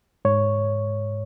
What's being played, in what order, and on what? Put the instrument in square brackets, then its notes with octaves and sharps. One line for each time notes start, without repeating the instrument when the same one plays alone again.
[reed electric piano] G#2 C#5